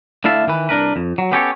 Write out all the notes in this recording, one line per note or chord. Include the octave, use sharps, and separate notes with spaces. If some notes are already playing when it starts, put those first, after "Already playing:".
D3 A3 E4 E5 F5 A5
D#3 E3 B4
C2 D4 A#4 B4
F2
F#3
B3 C#4 G4 A4 A#4 C#5